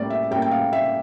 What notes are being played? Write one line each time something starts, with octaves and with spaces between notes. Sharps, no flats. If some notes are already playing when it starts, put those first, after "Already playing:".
Already playing: A2 G3 A#3 C#4 D5
E5
A2 G3 A#3 C#4 G5
G5
F5
E5